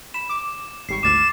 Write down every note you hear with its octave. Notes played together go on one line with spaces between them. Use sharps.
B5 E7
D6
G#1 G3 C#6 C7
G#1 D2 D6 F6 A6 E7